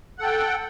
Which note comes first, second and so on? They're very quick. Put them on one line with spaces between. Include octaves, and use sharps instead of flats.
F#5 A4 G5